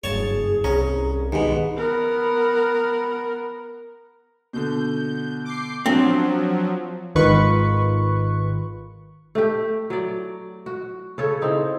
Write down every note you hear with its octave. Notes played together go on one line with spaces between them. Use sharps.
F#1 G2 G#4 C#5 A5
C2 C#4 A#5
G#2 B2 D#3 G4 G#4
B3 A#4
B2 D3 G6
D6 G6 C7
F3 F#3 C4 D4
G#1 G#2 D#3 F4 B4 C#6
A3 G4
F#3 D5
F#4
C#3 A4 C#5
C4 D#4 E4